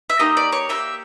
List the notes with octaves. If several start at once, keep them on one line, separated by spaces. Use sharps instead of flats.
E5
A#3 D#4 G4 D#5
D5
C#5
A#3 D#4 G4 E5